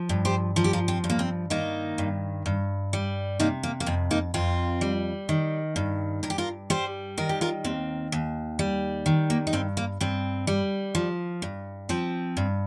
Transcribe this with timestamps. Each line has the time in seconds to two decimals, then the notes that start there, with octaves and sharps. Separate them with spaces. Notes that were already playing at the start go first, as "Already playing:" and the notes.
Already playing: F3
0.09 G2
0.25 G4 C5
0.56 F3 A#4
0.64 G4
0.73 F4 A#4
0.88 C4
1.04 G2
1.10 A#3
1.19 C4
1.50 D#3 A#3 D#4
1.98 G2
2.46 G2
2.93 G3
3.39 C3 A#3 D#4
3.63 A#3
3.80 A#3
3.86 F2 C4
4.11 A#3 D#4
4.34 F2 C4 F4
4.81 G3
5.29 D#3
5.76 G2
6.23 G2 A#4
6.30 G4
6.38 F4 A#4
6.70 G3 G4 C5
7.18 D#3 A#4
7.29 G4
7.41 F4 A#4
7.64 D#2 C4
8.12 D#2
8.59 G3
9.06 D#3
9.30 A#3
9.47 D#4
9.53 G2 C4
9.77 A#3
10.00 G2 C4
10.47 G3
10.95 F3
11.42 G2
11.89 F3 C4
12.37 G2